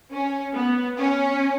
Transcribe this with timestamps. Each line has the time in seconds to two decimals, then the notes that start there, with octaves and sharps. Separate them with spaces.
0.11 C#4
0.54 B3
0.97 C#4